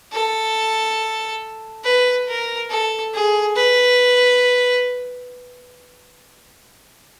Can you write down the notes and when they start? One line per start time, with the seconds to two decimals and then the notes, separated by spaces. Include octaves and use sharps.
0.13 A4
1.84 B4
2.28 A#4
2.70 A4
3.13 G#4
3.56 B4